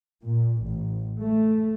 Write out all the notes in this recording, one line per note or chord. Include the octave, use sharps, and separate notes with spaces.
A#2
A1
A3